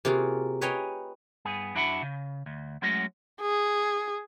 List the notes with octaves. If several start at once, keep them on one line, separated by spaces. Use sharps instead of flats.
C3 A#3 F4 F#4 G#4
B4 C#5 D#5 G5 G#5 A#5
G2 B3 G#4
F#2 D4 E4 F#4 F#5 B5
C#3
D2
F#3 G#3 A3 C#4 F#4
G#4